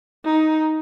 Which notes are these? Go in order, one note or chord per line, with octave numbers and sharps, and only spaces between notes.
D#4